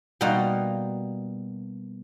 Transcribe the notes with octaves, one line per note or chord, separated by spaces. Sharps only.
B2 G3 A#3 D#4 F4 F#4